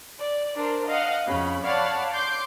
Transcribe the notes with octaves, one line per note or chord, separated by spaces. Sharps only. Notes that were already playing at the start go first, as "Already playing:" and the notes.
D5
D4 A#4 C5
D#5 F5 F#5
F2 C#3 B5
C#5 D5 F5 F#5 A5 B5
C6 D6 G6 C7